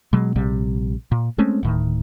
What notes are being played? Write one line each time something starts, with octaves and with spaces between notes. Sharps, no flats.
B2 F#3 G#3
A#1 C3 G3
A#2
G#3 A3 C4 C#4
D1 A2 D#3